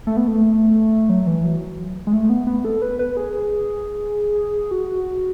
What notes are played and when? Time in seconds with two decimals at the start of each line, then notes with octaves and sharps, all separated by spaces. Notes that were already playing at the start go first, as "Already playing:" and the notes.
0.07 A3
0.17 B3
0.28 A3
1.09 F#3
1.27 E3
1.44 F#3
2.07 G#3
2.13 A3
2.30 B3
2.47 B3
2.65 A4
2.82 B4
2.99 B4
3.17 G#4
4.71 F#4